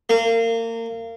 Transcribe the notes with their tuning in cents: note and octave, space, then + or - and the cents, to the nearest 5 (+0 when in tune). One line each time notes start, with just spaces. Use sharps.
A#3 -30